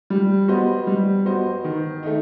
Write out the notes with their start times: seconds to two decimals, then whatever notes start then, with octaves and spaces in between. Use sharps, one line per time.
0.10 G3
0.48 B3 F#4 C5 D#5
0.87 G3
1.25 B3 F#4 C5 D#5
1.64 D#3
2.03 A3 D#4